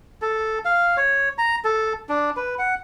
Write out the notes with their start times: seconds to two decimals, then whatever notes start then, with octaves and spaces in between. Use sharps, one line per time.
0.22 A4
0.65 F5
0.97 C#5
1.38 A#5
1.64 A4
2.09 D4
2.37 B4
2.59 F#5